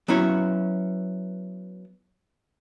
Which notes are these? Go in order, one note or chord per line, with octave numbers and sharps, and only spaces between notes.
F#3 B3 C#4 E4 C#5